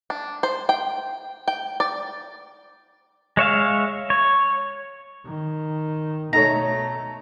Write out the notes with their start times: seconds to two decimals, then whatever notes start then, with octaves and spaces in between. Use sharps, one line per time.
0.10 D4
0.43 C5
0.69 G5
1.48 G5
1.80 D5
3.37 G#3 C#5 E5 F5
4.10 C#5
5.26 D#3
6.33 B2 A3 D#4 A4 C#5 A#5